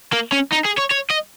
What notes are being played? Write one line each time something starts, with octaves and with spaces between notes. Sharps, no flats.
A#3
C#4
D#4
G#4
C#5
C#5
D#5